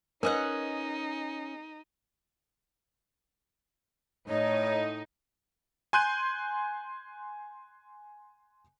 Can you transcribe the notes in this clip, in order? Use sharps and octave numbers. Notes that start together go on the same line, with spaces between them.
C#4 D#4 G#4 A#4 B4 D#5 F#5
A2 D#4 C#5
G#5 C6 F#6 G6 D#7